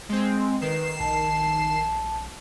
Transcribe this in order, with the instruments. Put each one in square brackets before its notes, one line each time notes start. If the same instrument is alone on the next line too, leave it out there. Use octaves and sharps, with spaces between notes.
[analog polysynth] G#3 C4
[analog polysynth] D#3 C7 E7 [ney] B4
[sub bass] A#1 [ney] A5